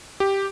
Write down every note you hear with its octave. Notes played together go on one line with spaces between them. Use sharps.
G4